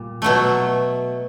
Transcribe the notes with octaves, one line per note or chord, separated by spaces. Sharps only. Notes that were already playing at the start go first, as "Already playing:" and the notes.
Already playing: A#2 G3
B2 F#3 A3